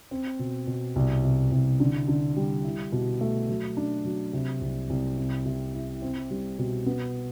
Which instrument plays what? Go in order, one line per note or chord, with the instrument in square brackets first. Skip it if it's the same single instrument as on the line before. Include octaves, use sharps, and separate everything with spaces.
[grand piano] C4
B2
B2
C2
C3
C2
D3
D3
G3
E4
B2
A3
F#3
D4
F#3
C3
C2
C2
C4
C3
E4
C4
G3
B2
B3